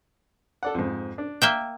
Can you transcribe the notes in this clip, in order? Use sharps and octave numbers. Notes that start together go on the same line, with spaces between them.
A4 D5 F#5
F2 G#2
D4
A#3 E5 G5